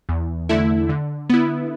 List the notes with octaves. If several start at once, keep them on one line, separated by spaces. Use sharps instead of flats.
E2
D3 A3 E4
D3
B3 E4